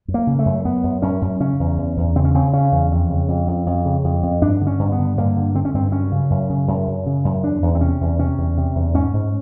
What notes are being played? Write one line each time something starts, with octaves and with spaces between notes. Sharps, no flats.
F#2
A#3
C#3
A3
F#2
F#2 B3
F#2
F#2 C#4
F#2
C#3 C#4
E2
E2
E2
C#3 C4
C#4
C#3 C4
C#3 C#4
E2
F2
C#3
F2
F2
F2
C#3
F2
F2
G2 D4
D3
C#4
G2
B3
D3
G2 A#3
D3
D3 C4
C#4
G2 C4
F#2 C#4
C#3
F#2
C#3
F#2
F#2
C#3
F#2
E2 D4
E2
C4
C3 C#4
E2
C3 C#4
E2
C3
E2
G#2 C#4
G#2